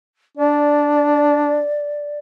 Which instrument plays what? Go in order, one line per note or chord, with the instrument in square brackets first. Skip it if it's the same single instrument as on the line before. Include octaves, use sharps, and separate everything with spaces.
[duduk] D4 [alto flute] D5